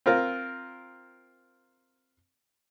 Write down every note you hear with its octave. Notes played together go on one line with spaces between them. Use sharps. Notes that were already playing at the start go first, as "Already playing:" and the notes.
C4 F4 A#4